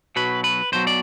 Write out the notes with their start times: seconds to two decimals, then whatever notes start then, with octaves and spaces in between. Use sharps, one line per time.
0.16 B1 B2 F#3 B4
0.44 B4
0.72 B1 B2 F#3 C5
0.87 D5